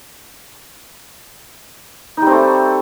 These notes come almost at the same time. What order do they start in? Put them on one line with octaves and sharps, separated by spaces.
D#4 G3 C4 A3